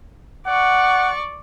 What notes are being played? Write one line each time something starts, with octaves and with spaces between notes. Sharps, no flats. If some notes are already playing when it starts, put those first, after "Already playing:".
D5 F#5 C#6